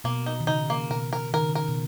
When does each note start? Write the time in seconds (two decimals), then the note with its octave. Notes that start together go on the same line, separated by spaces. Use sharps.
0.04 B2 A#3
0.26 D#4
0.40 D#3
0.47 C#3 D#4
0.70 A#3
0.90 B2 A#4
1.13 A#4
1.34 D#3 A#4
1.41 C#3
1.49 D#3
1.55 A#4
1.68 B2